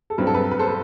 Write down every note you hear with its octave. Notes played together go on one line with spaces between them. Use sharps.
A4
G2 F#3 C4 B4
A4
B4
B4
A4 C5
B4